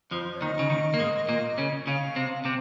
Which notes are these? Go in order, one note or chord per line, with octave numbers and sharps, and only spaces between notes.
F2 F3 C5
D#2 D#3 D#5
C#3
D#2 D#3
A#3
G#2 G#3
A#2 A#3
C#3 C#4
C#3 C#4 F5
C3 C4
C3 C4